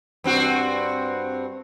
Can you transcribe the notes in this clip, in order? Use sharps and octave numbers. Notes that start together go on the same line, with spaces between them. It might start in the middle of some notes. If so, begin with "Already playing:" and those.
G2 C4 F#4